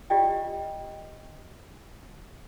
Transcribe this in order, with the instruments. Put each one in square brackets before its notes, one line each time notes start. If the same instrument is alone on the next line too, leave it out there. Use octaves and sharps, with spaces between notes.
[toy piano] F4 G4 D5 D#5 G5